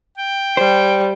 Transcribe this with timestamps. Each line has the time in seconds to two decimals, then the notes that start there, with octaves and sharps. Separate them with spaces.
0.17 G5
0.57 G3 C5